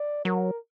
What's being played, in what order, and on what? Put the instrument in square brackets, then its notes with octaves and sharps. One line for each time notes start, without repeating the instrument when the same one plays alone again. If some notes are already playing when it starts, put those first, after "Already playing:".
Already playing: [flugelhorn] D5
[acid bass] F#3 [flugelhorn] A#4